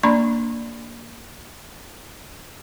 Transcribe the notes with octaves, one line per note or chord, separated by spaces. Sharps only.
A#3 D4 D5 A#5 B5 C#6